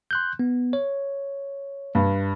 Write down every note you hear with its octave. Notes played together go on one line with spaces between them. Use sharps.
C6 F#6 G6
B3
C#5
G2